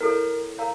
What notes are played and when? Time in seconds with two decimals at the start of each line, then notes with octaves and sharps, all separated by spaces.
0.01 E4 A4 A#4 C#5
0.58 A#4 C#5 F5 A#5